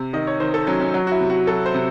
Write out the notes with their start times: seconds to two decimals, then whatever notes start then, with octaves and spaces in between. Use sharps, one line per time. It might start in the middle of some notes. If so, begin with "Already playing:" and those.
Already playing: C3
0.13 D#3 D#5
0.27 C#5
0.40 D#3 C5
0.54 A4
0.66 F#3 C#4
0.80 C#4
0.94 F#3
1.07 F#4
1.12 E4
1.20 C3
1.30 F#4
1.47 F#3 A4
1.66 C5
1.74 C3